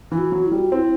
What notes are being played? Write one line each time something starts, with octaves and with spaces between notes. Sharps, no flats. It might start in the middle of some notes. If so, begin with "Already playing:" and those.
E3 E4
F#4
F#3
E4
G3
F#4
C4 E4